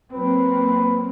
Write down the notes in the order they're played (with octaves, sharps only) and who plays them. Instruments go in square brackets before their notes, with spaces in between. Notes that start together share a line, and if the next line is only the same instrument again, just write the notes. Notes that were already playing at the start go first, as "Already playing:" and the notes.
[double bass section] F#3 A#3 C4 [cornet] B4